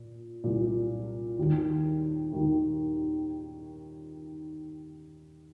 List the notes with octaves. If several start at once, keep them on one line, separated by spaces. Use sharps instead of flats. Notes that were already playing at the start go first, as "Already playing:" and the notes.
Already playing: A#2
C2 A#2
D#2 D#3
D#2 D#3